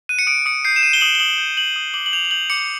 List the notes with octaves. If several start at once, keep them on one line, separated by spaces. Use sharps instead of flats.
F#6 D#7
C#7
D#6 D7
D#6 C#7
G6 C7
E7
G6 D#7
G7
D#6 F#7
G7
D#6 F#7
G6
G6 F#7
D#6
D6 F#7
F#7
G6 F7
F7
G6 F#7
D6 C#7